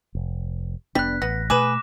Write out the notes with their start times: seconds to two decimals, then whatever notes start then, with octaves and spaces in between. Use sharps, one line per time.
0.15 F1
0.95 F1 G3 B3 D4 F#6 B6
1.22 A1 B3 A#6
1.50 B2 A3 G#4 B4 D6 E7